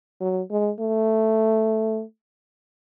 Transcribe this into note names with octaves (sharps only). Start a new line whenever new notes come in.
F#3
G#3
A3